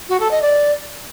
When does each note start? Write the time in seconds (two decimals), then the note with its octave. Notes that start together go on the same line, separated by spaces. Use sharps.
0.08 F#4
0.19 A4
0.30 D#5
0.41 D5